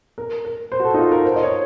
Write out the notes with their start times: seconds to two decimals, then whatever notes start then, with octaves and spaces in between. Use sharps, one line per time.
0.18 A#4
0.45 A#4
0.72 C5
0.80 F#4
0.85 A4
0.94 D#4
0.98 F4
1.12 A#4
1.25 C5
1.36 D#5
1.43 C#5